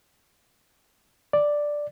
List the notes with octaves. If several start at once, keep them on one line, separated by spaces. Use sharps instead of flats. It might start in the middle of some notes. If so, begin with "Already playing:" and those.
D5